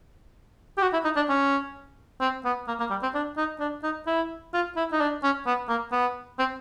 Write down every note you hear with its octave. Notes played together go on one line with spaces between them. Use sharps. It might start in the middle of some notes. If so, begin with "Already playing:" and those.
G4
F#4
E4
D#4
D4
C#4
C4
B3
A#3
A#3
G3
C4
D4
D#4
D4
D#4
E4
F4
E4
D#4
D4
C#4
B3
A#3
B3
C4